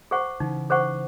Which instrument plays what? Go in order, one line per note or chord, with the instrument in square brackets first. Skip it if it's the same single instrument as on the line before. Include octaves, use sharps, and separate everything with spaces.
[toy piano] G#4 C5 F#5 C#6
[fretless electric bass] C#3 E3 [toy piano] D#4
[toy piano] G#4 C5 F#5 C#6